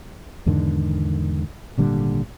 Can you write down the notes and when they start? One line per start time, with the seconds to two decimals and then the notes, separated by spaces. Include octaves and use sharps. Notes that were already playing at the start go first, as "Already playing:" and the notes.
0.46 E2 G#2 D3 D#3
1.77 G#1 A#2 D3 G3